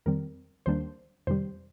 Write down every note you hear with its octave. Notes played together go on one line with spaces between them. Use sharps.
F2 D#3 G3 C4 A#4
D#2 D#3 G3 A#3 D4 C5
F2 C3 D#3 G3 C5